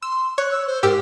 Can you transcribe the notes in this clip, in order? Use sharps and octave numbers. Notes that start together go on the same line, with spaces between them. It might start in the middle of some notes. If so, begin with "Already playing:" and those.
C6 E6
C#5 F#6
E6
C5
G#2 G4 A#4 E6